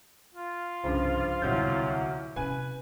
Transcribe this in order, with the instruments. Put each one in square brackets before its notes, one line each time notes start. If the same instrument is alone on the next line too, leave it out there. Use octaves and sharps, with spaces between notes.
[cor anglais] F4
[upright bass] C2 [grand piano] G2 C#3 [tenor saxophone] F3
[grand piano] D1 C2 G6 [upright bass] B2 E3 [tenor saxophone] F#3
[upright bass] C3 C#4 [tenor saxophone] B4 [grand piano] G#5